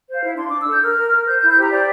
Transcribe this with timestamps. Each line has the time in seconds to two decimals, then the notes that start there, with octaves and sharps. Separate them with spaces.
0.08 C5
0.15 F5
0.23 E4
0.37 D4 C6
0.49 D6
0.53 D4
0.60 E6
0.67 A4 G6
0.82 A#4 F6
0.97 A#4
1.12 A#4
1.27 C5 G6
1.39 G6
1.42 E4
1.49 G6
1.57 G4 A#5
1.72 C5 D5